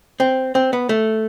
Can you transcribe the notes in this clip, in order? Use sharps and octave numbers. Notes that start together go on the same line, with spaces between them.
C4
C4
B3
A3